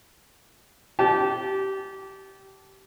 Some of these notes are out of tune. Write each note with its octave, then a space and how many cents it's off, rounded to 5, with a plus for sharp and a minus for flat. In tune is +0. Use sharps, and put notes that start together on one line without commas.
G4 -20 A5 -20